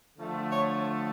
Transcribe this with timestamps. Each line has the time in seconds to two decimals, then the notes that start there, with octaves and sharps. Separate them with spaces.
0.18 D3 F3 A3
0.52 C#5